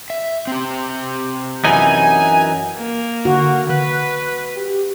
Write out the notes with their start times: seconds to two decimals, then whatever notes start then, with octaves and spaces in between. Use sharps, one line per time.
0.10 E5
0.47 C4 G4
1.64 F#2 E3 D#4 G#5
2.77 A#3
3.25 D3 F#4
3.70 B4 F#6
4.56 G4